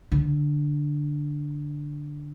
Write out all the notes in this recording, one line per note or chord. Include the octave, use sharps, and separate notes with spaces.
D3